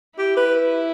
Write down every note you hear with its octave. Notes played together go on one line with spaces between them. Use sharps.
E4 G4
B4